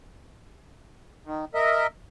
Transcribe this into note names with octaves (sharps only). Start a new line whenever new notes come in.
D#3
A#4 D#5 E5